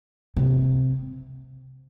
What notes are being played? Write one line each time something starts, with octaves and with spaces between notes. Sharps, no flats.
C3